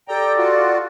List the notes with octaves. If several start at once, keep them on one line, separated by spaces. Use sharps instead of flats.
G4 A4 D5 G5 A#5
F4 F#4